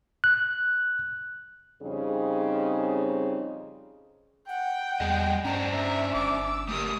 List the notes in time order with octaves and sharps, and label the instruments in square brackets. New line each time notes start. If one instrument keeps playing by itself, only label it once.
[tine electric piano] F#6
[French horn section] F2 C#3 G3 C4 D#4 G#4
[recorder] F#5 [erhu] G5
[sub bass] E2 [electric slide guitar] G3 G#4 D#5
[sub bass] G2 [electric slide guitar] C#4 D4 C5 [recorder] A#5
[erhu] E5
[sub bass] G1 [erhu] D6 [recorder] E6
[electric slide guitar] A3 G4 A#4 [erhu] D#6